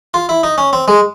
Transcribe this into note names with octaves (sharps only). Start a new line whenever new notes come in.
F4
E4
D#4
C#4
C4
G#3